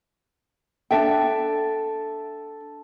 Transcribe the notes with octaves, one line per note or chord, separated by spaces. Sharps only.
D4 A4 E5 G5